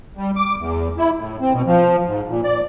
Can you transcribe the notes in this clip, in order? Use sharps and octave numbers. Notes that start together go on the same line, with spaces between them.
G3
D6
E2
E4
A2
C4
B2
F3
G#2
A#2
D5